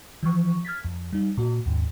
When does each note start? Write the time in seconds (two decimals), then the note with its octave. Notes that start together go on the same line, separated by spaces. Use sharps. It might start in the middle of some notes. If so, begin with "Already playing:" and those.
0.23 E3 F3 C#6
0.65 F6 G#6 A6 B6
0.85 F2
1.13 G3 D#4
1.37 A#2 F#4
1.66 D#2 G#2